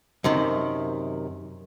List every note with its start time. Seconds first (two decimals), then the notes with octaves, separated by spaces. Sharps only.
0.24 F#2 C3 D#3